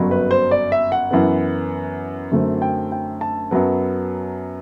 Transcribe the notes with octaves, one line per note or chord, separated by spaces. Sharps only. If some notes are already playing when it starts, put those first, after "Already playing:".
Already playing: G1 F#2 F#3
B4
C5
D5
E5
F#5
F#2 E3 B3
F#2 D3 F#3 A3 C4
G5
G5
A5
F#2 F#3 B3